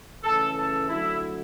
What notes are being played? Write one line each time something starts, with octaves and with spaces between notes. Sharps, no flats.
C#3 E3 A3 C#4 A4
A4
D3 F#3 A3 E4